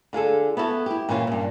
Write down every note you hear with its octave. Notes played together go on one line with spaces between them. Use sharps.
D3 F4 G#4 A4
B3 E4 F#4 A4
E4 G4
A#2 E3 C#4 F4
G2 A#2